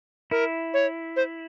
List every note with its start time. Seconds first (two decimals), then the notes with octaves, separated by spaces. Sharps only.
0.31 E4 A#4
0.74 C#5
1.16 C5